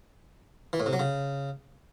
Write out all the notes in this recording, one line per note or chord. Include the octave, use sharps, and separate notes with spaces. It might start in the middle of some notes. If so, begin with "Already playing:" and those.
E3
A2
C3
F#3
C#3